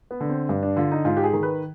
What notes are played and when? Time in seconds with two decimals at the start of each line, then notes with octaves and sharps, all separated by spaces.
0.11 B3
0.20 D3
0.29 C4
0.49 G2 D4
0.63 D4
0.76 D3 F4
0.91 D#4
1.05 G#2 F4
1.17 G4
1.24 G#4
1.33 D#3
1.43 B4